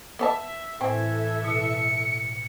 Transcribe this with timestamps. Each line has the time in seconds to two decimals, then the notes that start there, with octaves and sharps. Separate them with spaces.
0.19 B3 C#5 E5 A5
0.81 A2 E3 C4 A4 E5 G#5 G#6
1.44 B2 C#7